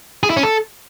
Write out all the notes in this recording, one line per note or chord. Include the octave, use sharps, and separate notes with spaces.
G#4
E4
C#4
A4